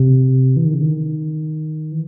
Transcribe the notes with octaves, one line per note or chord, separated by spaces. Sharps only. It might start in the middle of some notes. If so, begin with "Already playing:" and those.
Already playing: C3
E3
D#3
C#3
D#3
E3